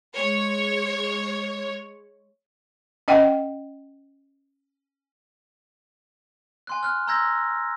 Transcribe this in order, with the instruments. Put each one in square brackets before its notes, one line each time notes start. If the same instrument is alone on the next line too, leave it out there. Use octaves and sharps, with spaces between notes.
[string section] G#3 C#5
[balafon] C#4 D#5 F#5 G5
[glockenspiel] G#5 C6 F#6
F6 F#6
A#5 C6 E6 G6 G#6 A#6